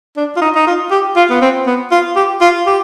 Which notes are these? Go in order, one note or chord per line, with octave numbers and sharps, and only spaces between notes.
D4
F4
D#4
D#4
F4
G4
F4
B3
C4
B3
F4
G4
F4
G4